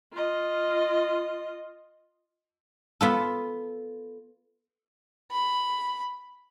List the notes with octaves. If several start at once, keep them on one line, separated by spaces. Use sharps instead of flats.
F4 D#5
B3 F4 A4
B5